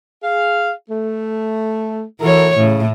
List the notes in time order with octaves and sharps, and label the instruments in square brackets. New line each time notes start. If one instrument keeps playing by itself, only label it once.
[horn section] G#4 F5
A3
[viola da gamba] E3 C#5 [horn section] F#4 A4 A#4
[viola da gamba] A2 [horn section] C#3